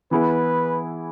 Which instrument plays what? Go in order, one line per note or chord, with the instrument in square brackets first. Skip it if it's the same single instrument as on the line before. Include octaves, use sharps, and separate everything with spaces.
[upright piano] E3 B3 E4 G#4 [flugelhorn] B4